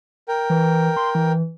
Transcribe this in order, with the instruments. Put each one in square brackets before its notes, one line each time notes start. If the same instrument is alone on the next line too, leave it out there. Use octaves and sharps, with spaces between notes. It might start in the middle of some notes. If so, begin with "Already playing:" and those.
[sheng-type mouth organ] A#4 G5
[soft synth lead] E3
C6
E3